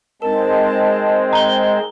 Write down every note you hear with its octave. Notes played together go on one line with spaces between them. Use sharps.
G#3 C4 D#4 A#4 A5
G5 A#5 G7